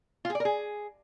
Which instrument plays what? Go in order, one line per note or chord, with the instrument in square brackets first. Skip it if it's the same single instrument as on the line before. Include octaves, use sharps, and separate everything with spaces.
[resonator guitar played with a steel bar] F4
G#4
D5
A#4
G#4